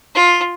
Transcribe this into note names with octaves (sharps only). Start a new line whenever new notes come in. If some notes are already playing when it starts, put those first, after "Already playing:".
F4